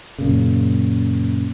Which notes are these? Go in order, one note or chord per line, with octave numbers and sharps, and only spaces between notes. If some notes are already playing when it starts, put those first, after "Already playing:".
F#2 A#2 C#3